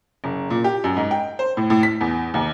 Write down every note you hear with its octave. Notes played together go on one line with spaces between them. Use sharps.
F#1
A#2
G4
F#2
G#2
G5
C5
A2
A2
B6
E2
D#2